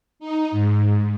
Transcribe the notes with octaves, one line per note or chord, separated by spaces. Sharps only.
D#4
G#2